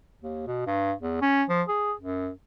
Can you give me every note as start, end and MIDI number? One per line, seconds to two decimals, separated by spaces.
0.21 0.45 39
0.47 0.64 47
0.66 0.93 43
1.01 1.18 40
1.21 1.44 61
1.49 1.62 53
1.68 1.93 68
2.00 2.29 42